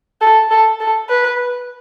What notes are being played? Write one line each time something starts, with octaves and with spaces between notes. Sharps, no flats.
A4
A4
A4
B4